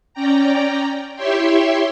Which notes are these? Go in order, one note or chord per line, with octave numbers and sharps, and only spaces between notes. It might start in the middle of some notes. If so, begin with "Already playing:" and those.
C#4 D5 G5 A#5
E4 G4 C#5 E5 G5 C6